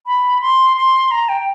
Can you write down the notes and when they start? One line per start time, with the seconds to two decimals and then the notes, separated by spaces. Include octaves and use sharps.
0.07 B5
0.41 C6
0.77 C6
1.11 A#5
1.29 G5